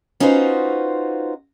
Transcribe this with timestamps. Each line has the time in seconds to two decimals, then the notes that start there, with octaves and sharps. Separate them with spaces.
0.20 C#4 D#4 F4 F#4 B4 C5